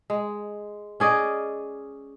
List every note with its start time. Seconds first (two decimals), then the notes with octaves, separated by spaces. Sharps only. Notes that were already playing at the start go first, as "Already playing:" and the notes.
0.10 G#3
1.00 C#4 G#4 D5 D#5